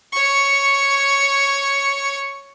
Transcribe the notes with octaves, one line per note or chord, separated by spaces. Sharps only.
C#5 C#6